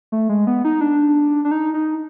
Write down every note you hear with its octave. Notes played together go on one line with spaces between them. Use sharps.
A3
G#3
B3
D#4
D4
D4
D#4
D#4